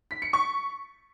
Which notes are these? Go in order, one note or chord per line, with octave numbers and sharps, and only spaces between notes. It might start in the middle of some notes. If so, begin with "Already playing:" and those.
B6
C#7
C#6